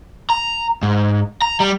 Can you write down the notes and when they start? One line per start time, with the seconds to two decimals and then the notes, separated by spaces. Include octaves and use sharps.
0.30 A#5
0.83 G#2
1.42 A#5
1.60 G3